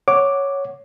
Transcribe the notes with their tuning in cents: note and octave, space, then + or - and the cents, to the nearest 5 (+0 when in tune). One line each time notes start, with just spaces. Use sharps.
C#5 +0 F#5 +0 D6 +0